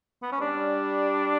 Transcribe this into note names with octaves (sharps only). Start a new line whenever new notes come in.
B3
C#4
G3 D4